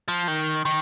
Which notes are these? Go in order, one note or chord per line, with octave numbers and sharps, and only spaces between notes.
F3
D#3
D#3